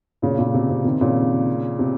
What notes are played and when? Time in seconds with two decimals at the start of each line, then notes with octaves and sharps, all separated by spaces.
0.22 A#2 C#3
0.38 A#2 C#3
0.54 C3
0.69 C3
0.85 C3 D#3
1.01 A#2 C#3
1.79 C3